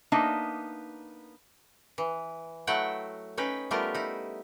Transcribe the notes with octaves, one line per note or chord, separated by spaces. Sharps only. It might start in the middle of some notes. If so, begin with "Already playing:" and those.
A#3 B3 D4 D#4 E5
E3
F#3 A3 E4 F#5 G5
C#4 D#4 B4 G5
G3 A3 B3 F4 G4 A#4
D#4 E4